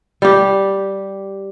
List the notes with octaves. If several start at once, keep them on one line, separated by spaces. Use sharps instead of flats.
G3 G4